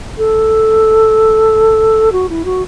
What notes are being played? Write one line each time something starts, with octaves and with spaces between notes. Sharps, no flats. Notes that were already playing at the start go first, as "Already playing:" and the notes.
A4
F#4
E4
F#4